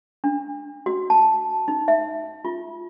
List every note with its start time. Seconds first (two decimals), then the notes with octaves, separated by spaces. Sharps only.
0.24 D4
0.86 F#4
1.10 A5
1.68 D#4
1.88 E5
2.45 F4